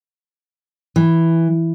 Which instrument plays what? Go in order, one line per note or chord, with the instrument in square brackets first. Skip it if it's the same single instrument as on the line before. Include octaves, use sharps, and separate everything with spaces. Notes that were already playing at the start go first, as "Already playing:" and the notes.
[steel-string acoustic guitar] E3